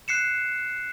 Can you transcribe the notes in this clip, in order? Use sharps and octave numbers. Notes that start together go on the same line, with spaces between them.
F#6 C7 C#7 E7